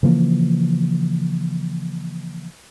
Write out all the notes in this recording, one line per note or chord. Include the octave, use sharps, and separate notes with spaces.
C#3 E3 F3 A#3